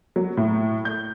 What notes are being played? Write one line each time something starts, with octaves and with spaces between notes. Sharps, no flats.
F#3
A2
G6